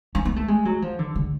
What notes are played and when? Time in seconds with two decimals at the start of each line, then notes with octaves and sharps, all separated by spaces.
0.15 C#4
0.25 B3
0.36 A3
0.48 G#3
0.65 F#3
0.82 F3
0.99 D3
1.16 D3